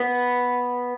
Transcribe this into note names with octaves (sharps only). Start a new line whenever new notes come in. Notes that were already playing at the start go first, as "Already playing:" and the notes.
Already playing: B3